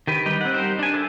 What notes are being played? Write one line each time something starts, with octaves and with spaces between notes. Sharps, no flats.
D#3 G4 B4
G3 D#4 B4
C4 F#5
G3 D#4 G4 A#4 C5
D4 G#5
A4 C5 E5